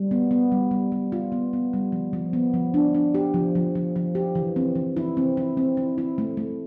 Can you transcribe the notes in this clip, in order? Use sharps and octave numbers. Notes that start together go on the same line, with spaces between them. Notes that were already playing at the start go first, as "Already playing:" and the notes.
Already playing: G3
B3
B3
G3
G3
G3
F4
B3
B3
G3
F3
F3
B3
F3
D4
D4
G4
F3
F3
F3
F3
G4
E3
C4
E3
E4
C4
E4
C4
E4
E4
A3
A3